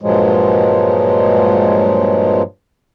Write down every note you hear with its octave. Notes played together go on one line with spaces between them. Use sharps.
G2 A#2 F3 F#3 G#3